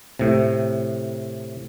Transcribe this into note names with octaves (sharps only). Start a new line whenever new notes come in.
A2 C3